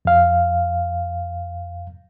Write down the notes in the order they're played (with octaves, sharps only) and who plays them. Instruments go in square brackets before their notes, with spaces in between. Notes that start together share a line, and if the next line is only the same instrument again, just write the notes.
[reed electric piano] F2 F5